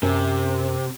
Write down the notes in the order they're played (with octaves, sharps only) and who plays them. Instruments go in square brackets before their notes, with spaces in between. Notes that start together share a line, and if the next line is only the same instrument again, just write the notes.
[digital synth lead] F#2 [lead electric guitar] C3